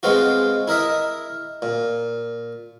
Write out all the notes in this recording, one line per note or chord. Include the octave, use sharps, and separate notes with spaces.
G#3 B3 C4 F4 F#4
E4 A#4 D#5 E5
A#2